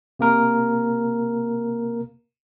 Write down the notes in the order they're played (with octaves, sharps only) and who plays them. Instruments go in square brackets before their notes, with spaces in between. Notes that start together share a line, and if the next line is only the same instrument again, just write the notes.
[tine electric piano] C3 A#3 A#4